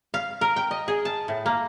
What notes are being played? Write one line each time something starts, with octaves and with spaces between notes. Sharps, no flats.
F5
A#4
G5
D#5
G#4
A5
A2
A#3